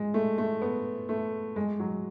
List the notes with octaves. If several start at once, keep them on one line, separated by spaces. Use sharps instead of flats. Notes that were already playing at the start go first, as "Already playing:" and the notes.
Already playing: G#3
A3
A3
B3
A3
G#3
F#3